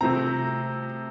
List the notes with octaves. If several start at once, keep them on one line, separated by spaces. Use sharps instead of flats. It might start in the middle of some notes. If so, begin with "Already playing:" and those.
C3 F3 A3 C4 A#5